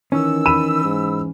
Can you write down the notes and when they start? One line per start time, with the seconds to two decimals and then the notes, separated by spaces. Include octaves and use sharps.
0.12 D#3 E3 C#4 E6
0.46 B5 D#7 E7
0.84 G#2